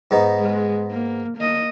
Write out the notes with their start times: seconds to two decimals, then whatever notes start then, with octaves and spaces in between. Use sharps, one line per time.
0.11 G#2 B3 D#4
0.39 G#3
0.92 A#3
1.38 A#3 D#5